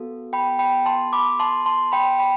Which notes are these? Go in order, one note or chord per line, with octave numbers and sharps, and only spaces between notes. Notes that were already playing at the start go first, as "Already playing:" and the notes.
Already playing: B3 F#4 A4
G5 B5
G5 B5
A5 C6
B5 D6
A5 C6
A5 C6
G5 B5
G5 B5